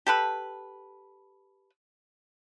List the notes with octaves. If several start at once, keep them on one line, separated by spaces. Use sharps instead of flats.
G4 A4 B4